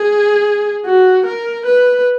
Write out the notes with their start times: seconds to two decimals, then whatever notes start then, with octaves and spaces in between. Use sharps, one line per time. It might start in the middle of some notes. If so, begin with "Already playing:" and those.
Already playing: G#4
0.86 F#4
1.26 A#4
1.66 B4